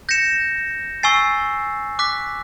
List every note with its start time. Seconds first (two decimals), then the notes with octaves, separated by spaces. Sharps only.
0.09 G6 A#6 C#7 E7
1.03 G#5 C#6 E6 A6 C7
1.99 D6 F#6 B6